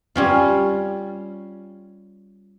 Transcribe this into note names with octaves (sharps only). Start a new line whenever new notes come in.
G3 C#4 F4